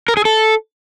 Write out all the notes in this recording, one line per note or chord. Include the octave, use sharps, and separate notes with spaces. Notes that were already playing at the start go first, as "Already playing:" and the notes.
A#4
G#4
A4